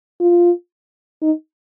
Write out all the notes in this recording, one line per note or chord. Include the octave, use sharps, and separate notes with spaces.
F4
D#4